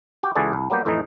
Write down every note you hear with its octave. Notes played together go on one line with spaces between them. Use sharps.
F#4 G4
C#2 E3 F#4 G#4 A4 D5
C2
F#3 G3 A#3 B3 G4
F2 A2 E3 A3 D#4